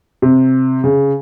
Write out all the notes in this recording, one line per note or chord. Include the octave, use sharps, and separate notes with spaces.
C3
C#3